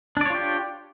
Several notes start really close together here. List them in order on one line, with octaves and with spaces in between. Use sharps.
D4 D5 C#5 F4 G4